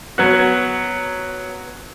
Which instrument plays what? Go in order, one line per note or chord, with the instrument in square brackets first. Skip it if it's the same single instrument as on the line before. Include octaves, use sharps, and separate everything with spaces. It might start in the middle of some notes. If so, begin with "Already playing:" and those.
[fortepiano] F#3 B3 F#4